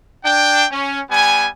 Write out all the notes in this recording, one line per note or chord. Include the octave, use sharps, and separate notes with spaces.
D4 G5
C#4
G3 B3 G#5